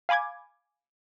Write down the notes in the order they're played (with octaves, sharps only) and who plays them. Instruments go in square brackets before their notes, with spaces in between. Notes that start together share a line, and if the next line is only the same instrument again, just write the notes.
[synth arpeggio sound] F5 G#5 B5 D6 G#6